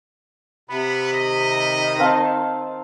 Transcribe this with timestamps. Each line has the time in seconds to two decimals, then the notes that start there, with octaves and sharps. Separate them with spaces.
0.69 C3 B3 B5
1.13 D#3 D#5
1.99 C4 F5 A5